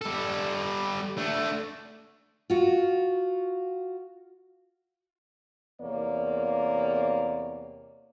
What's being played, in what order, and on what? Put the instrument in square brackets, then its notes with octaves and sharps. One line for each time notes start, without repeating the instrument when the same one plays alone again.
[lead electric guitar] G3 A4
A3 D4
[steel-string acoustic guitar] F4 F#4
[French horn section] E2 C3 A#3 C#5 D5